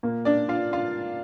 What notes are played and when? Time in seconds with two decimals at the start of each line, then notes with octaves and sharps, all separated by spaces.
0.03 A#2 A#3
0.25 D4 D5
0.49 F4 F5
0.73 F4 F5